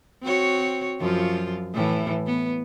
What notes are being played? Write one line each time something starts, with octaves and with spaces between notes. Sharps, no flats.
C4 F#4 C#5
F#2 F3 F4
A2 E3
B3